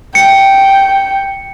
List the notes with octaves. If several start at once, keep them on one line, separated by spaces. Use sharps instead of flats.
G5 C#7